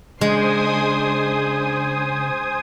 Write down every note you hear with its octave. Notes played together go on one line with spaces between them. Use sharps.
C#3 G#3 D4 C5 G#5 C6 D#6